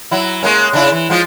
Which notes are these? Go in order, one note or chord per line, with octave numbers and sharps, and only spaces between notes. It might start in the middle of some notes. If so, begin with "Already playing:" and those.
F#3 E4
G#3 A#3 C#4
C#3 D4 E4
E3
F3 G#3 F4